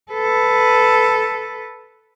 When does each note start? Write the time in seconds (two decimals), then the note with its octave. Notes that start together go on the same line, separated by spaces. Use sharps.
0.12 A4 B4